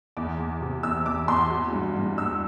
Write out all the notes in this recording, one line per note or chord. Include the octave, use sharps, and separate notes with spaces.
E2 D6
E2
C3
E2 E6
E2 D6
E2 C6
F#3
G2
G2
G2 E6